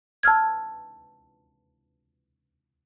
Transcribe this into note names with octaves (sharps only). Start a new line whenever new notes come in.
A5 E6 F6 G#6